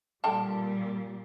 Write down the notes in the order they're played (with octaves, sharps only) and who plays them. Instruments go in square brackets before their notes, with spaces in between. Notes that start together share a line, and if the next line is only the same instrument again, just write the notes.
[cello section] A#2 G3 [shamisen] D3 G5 A5